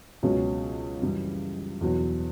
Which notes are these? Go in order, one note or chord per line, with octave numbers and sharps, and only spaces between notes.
C#2 B2 F#3 C#4
F#2 C#3 E3 G3
E2 B2 F#3